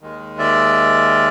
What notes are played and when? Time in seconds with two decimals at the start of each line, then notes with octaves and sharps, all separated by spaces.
0.01 D#2 D#3 G#3
0.39 D5 E5